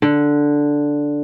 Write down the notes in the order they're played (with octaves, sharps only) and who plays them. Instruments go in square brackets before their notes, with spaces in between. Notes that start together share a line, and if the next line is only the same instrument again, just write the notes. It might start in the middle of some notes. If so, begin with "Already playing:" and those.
[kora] D3